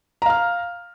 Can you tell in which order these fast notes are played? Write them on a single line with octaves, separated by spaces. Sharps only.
A#5 F5 F6